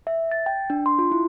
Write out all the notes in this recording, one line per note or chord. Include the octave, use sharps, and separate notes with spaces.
E5
A6
G5
D4
C6
F4
E4